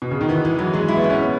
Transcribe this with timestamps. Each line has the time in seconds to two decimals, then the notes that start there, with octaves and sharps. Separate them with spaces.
0.02 B2
0.11 C#3
0.21 D#3
0.29 E3 B3
0.45 E3 G#3
0.59 E3 F#3
0.74 F#3 G#3
0.88 E4
0.96 B3
1.04 B2
1.10 C#4
1.24 B3